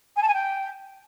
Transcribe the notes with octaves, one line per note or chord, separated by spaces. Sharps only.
G#5
A5
G#5
G5